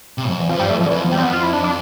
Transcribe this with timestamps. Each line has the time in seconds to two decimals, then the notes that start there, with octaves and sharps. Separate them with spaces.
0.18 C3
0.29 F2
0.38 E2
0.49 F2 F3
0.59 G2 G3
0.70 F2 A3
0.76 E3
0.80 F2 F3
0.86 D3
0.90 F2 E3
1.01 F3
1.05 E2
1.12 G3
1.18 F2 B3 C4
1.33 F4
1.43 E4
1.53 D4
1.64 D4